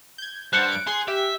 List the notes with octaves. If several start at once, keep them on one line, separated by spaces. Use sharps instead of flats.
G6 G#6
G2 G3 C5 F#5 A5 F#6 C#7
D7
G#4 C6
G4 E5